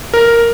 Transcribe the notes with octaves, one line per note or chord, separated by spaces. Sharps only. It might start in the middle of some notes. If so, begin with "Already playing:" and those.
A#4